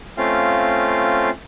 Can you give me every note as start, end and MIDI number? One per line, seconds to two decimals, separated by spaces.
0.17 1.30 57
0.17 1.30 60
0.17 1.30 61
0.17 1.30 65
0.17 1.30 77